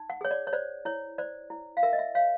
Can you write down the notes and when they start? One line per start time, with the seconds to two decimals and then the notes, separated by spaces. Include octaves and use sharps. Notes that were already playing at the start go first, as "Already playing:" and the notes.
Already playing: D#4
0.10 F#5
0.21 G#4 C#5
0.31 D5
0.47 C#5
0.53 C5 D5
0.85 E4 C#5
1.18 C5 D5
1.50 E4
1.77 F5
1.83 A#4 E5
1.93 D#5
1.99 E5
2.15 C#5 F5